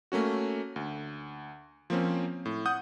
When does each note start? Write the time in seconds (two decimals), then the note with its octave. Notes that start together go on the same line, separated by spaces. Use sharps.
0.12 A3 A#3 C#4 F#4
0.76 D2
1.90 F3 A#3 C4 C#4
2.45 A2
2.66 F#5 D#6 G6